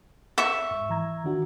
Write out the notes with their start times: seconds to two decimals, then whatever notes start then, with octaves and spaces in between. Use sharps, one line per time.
0.38 E5 C#6
0.71 G#2
0.90 E3 A#5 G#6
1.24 D#3 D4 F#4